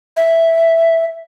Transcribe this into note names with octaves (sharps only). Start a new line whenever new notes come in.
E5